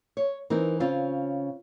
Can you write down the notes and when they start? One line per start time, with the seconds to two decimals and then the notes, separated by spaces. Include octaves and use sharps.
0.17 C#5
0.50 E3 C4 D#4 A#4
0.80 C#3 C4 C#4 F4